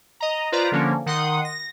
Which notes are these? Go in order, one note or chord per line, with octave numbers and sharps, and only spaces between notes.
D#5 A#5
F4 B4 C5 D5 A#5
D3 F3 A#3 C#4 D4
D#3 F#5 C6 D#6
A#6